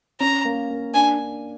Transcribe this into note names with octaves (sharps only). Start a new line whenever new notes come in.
C#4 A#5
A#3
A#3
D4 G#5
D4